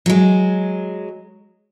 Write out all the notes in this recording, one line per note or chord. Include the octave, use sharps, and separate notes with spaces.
F#3 G#3